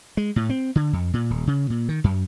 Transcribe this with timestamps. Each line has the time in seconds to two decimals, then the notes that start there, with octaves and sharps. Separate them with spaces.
0.17 G#3
0.36 A2
0.50 C4
0.76 D3
0.93 F2
1.13 A#2
1.30 D#1
1.47 C#3
1.70 A#2
1.89 D#3
2.04 F#2